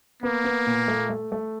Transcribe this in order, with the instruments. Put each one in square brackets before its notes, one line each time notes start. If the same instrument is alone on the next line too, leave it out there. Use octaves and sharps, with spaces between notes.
[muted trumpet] A#3 [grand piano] B3
[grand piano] B3
A#2
A3
A3
A3